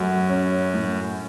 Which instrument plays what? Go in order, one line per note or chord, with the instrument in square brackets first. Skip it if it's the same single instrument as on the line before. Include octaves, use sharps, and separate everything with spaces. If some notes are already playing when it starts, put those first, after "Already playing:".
Already playing: [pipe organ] F#2 [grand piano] F#3 A3
[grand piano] C#4
A2